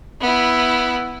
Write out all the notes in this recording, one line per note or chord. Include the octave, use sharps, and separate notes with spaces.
B3 E4